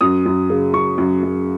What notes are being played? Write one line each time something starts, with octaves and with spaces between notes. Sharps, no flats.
F#2 D#6
F#2
C#3
F#2 C#6
F#2
F#2